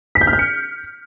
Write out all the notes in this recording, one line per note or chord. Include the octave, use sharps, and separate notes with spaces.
B6
G6
F6
G6
C#7